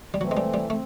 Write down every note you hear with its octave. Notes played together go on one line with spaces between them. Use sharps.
G3
E3 F#3 A3 C4
G#3
G3
G3
A3 C4